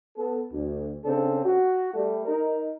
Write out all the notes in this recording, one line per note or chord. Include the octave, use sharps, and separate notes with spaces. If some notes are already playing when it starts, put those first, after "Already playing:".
B3 A4
D2
C#3 C4 D4 A4
F#4
G3 A3
D#4 A#4